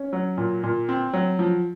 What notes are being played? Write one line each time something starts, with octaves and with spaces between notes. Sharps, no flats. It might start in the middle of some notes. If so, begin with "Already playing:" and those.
Already playing: C#4
F#3
A#2
A#2
C4
F#3
F3